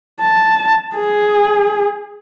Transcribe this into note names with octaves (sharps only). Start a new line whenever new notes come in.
A5
G#4